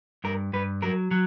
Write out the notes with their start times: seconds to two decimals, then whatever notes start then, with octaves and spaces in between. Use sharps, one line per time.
0.24 G2 A#4
0.53 G2 B4
0.82 F#3 A#4
1.11 F#3